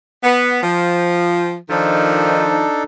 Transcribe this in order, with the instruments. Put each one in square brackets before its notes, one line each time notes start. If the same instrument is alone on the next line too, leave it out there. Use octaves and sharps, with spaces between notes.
[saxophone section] B3 [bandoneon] F#5
[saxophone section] F3 [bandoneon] G5
[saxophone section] D#3 F3 [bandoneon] D4 D#4 A4